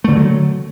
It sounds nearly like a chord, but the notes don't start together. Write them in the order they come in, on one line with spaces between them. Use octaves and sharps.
A3 D3 F3 F#3